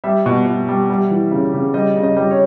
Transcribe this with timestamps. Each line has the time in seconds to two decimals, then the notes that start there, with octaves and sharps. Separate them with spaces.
0.04 G3 E5
0.26 B2
0.46 B2
0.68 G3
0.90 G3
1.11 E3
1.31 C#3
1.54 C#3
1.74 G3 D#5
1.96 C#3
2.03 D#5
2.16 G3
2.31 C#5